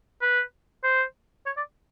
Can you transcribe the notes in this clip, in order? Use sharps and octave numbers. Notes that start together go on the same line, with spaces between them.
B4
C5
C#5
D5